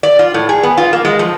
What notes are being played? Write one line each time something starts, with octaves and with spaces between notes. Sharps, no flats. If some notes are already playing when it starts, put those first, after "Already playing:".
D5
F4
A2
G#4
B3
F4
A#3
G#3
F3